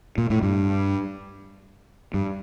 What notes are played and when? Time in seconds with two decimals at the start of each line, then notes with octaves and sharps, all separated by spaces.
0.18 A#2
0.30 A2
0.42 G2
2.14 G2